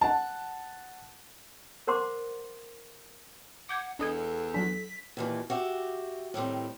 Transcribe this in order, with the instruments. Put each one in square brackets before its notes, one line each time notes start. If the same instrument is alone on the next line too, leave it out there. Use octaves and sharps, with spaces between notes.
[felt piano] F#5 A5
[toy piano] A#4 C5 F#5 C6 D6
[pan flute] F#5 [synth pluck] D6 G6 G#6
[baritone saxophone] E2 [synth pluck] D4 D#5 G#5 [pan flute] A4
[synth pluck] F#3 D4 [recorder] B6
[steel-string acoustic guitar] D#2 A#2 E3
F#4 G4 E5
A2 D#3 G3 C4